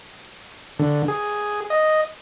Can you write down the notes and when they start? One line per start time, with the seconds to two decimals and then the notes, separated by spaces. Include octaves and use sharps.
0.79 D3
1.08 G#4
1.70 D#5